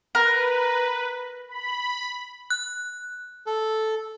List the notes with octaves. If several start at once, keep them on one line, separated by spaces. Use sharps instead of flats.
A#4 B4
B5
F#6
A4